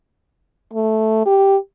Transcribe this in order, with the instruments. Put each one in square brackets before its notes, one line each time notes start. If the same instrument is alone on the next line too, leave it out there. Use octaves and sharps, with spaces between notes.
[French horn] A3
G4